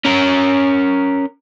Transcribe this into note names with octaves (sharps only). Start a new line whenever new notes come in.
C#4 A#4